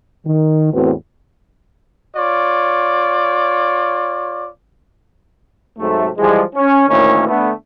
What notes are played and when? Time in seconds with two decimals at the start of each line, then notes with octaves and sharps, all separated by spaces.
0.25 D#3
0.73 E2 A2 C4 F#4 B4
2.16 F4 C#5 D5
5.79 G#2 C3 F#3 A3
6.18 E3 F3 G3 G#3
6.55 C#4
6.89 A1 D2 A2 D#3 A#3 C#4
7.28 D3 A3 B3